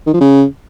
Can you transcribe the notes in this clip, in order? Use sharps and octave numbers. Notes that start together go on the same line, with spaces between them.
D#3
F3
C#3